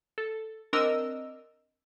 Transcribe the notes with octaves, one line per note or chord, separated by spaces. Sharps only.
A4
C4 D4 A#4 D#5 E6